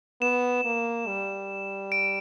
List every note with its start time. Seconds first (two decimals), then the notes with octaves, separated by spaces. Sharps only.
0.22 B3 E7
0.65 A#3
1.07 G3
1.92 D7